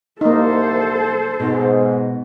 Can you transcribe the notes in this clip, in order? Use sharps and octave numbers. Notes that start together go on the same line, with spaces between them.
C2 A#3 D#4 A4 C5
G#2 B2